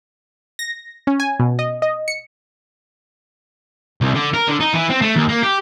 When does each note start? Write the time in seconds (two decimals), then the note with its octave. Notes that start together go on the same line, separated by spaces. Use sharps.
0.59 A#6
1.07 C#4
1.20 G#5
1.40 B2
1.59 D#5
1.82 D#5
2.08 C#7
4.01 C2
4.15 D3
4.34 A#4
4.48 D3
4.60 D#4
4.74 E3
4.90 C4
5.02 A3
5.16 D#2
5.29 A#3
5.43 G4